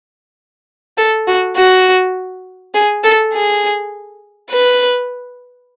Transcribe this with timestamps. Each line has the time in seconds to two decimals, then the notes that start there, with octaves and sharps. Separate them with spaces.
0.98 A4
1.27 F#4
1.56 F#4
2.74 G#4
3.04 A4
3.33 G#4
4.50 B4